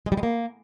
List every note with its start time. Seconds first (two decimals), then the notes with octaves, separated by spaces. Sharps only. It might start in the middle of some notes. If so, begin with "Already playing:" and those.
0.06 G#3
0.12 G3
0.17 G#3
0.23 A#3